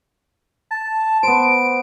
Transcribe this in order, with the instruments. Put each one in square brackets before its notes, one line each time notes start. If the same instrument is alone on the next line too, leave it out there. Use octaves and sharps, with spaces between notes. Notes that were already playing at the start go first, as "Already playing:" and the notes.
[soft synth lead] A5
[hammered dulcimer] B3 C5 [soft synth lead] D7